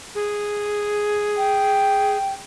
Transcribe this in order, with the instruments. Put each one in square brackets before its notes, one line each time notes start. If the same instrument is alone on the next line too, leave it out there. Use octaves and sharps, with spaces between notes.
[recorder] G#4
[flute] G5